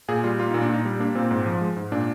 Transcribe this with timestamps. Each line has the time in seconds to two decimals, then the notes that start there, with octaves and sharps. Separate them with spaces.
0.08 A#2 G#4
0.24 G3 F4
0.39 A#3 F4
0.51 A#2 D#4
0.62 D4
0.69 A#2 D#4
0.85 G3
1.00 A#3 D4
1.15 A#2 C4
1.31 G#2
1.46 F3
1.61 G#3
1.76 G#2
1.92 A#2 D4